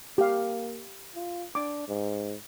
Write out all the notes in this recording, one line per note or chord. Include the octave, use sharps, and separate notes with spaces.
A#3 G4 F5
F4
D4 D6
G#2